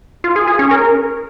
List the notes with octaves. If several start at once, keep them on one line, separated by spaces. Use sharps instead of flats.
F4
G#4
G#4
C#4
A#4